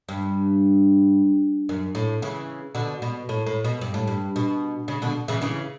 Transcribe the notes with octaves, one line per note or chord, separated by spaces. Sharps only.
G2
F#2
A2
C#3 E3
B2 D3
B2
A2
A2
B2
G2
A2
G2
B2
C#3
B2 D3
C#3 E3
C#3 E3